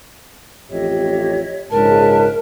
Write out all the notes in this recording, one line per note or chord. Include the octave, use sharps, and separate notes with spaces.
A1 F2 G4 C#5 D#5 E5
A#1 G#2 C#3 A#4 B4 A5